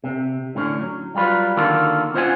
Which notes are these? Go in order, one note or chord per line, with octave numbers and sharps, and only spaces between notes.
C3
A2 D3 C#4
F#3
F#3 G3 F4 B4
D3 D#3 A#3 F4 F#4 A4
C#4 F4 C5 D#5 F#5 G#5